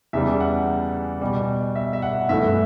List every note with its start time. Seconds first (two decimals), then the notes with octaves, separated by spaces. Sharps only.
0.13 E2 C#3 G3 E5
0.40 F#5
1.21 B2 G3
1.75 E5
1.93 E5
2.02 F#5
2.29 G2 E3 A3 E5